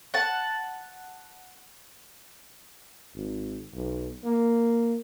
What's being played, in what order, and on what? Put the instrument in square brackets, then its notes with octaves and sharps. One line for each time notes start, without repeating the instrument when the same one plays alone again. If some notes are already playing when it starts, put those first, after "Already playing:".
[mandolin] F#5 A5
[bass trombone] G#1
B1
A#3